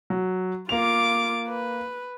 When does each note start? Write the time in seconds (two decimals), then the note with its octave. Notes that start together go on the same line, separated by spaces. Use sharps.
0.10 F#3
0.69 A#3 F4 D6 F7
1.48 B4